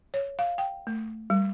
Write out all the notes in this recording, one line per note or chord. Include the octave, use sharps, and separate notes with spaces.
C#5
F5
G5
A3
G3